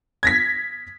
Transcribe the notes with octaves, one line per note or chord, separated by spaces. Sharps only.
G#6 A#6 B6